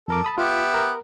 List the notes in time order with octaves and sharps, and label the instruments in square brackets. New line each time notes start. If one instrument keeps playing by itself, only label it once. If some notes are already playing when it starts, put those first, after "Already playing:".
[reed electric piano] F2 A#4 D6 [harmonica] A4
[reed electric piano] A5 B5 D#6
[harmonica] B3 G4 E5 [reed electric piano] F4
[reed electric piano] A#4